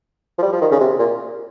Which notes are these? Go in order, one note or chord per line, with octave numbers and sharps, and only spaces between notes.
F3
G3
F3
D#3
C#3
C3
A#2